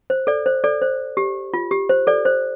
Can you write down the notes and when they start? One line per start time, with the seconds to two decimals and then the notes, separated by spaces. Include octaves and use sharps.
0.10 C5
0.27 A4 D5
0.46 C5
0.64 A4 D5
0.82 C5
1.17 G4
1.54 F4
1.71 G4
1.89 C5
2.07 A4 D5
2.25 C5